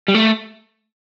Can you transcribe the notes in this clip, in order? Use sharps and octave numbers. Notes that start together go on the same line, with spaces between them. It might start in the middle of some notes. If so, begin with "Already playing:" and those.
G3
A3